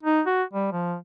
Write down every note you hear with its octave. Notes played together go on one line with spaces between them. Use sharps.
D#4
F#4
G3
F3